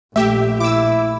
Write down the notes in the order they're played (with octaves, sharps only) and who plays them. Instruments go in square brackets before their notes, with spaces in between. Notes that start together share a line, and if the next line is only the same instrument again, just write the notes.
[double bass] A#1 [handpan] A3 [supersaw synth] G4 E5
[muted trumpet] E4 [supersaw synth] D6 E6